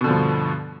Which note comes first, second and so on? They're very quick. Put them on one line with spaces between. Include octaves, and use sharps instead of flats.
B2 D3 F3 G2